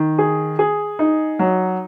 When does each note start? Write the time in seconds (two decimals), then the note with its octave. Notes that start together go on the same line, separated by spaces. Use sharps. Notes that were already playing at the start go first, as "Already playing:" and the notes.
Already playing: D#3
0.18 G#4
0.59 G#4
0.99 D#4
1.39 F#3